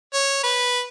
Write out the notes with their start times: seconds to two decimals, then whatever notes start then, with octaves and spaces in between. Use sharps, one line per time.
0.13 C#5
0.43 B4